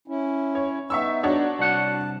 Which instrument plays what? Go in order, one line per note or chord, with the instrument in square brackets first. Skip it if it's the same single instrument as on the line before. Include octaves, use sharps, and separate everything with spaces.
[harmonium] C#4 E4
[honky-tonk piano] C#5
[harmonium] B3 D#4 [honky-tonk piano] E5 C#6 E6
[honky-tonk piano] D4 F#4 C#5
[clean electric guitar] C2 F#5 [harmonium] A5